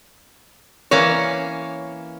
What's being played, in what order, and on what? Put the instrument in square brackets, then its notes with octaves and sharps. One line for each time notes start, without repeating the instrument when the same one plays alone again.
[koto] E3 A#3 C#4 [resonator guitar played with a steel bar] C#5